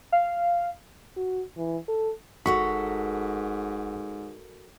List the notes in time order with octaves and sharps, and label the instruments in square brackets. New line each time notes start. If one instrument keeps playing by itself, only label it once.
[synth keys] F5
[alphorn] F#4
E3
A4
[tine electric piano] G1 F#5 B6 [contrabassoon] G#2 [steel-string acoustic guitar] F#4 A4 A#4 [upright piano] C#6